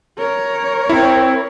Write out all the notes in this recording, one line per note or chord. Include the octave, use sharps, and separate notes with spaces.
A#4 C#5
C4 E4